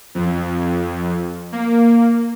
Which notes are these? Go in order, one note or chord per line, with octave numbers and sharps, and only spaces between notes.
F2
A#3